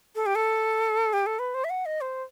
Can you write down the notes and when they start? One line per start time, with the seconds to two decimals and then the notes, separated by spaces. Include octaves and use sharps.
0.15 A4
0.26 G4
0.35 A4
1.13 G4
1.26 A4
1.39 B4
1.54 C5
1.64 E5
1.70 F#5
1.86 D#5
2.01 C5